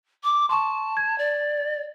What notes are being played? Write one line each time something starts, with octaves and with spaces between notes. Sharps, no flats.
D6
A5 C6 C#6
G#6
D5